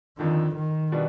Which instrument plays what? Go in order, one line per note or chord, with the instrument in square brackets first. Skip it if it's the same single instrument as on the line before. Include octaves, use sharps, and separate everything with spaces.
[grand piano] F2 D3 F3 [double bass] D#3
[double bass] D#3
[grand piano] B2 G3 B3 D4